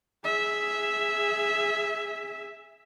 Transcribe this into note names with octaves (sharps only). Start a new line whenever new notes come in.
G#4 E5